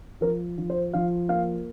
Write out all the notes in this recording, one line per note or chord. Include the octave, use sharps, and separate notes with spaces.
F3 A#4
F3
C5
F3 F5
A#3 F5